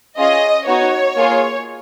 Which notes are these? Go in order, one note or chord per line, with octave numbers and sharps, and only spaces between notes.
C#4 F4 G#4 D#5
B3 D#4 F#4 C#5
A#3 F4 G#4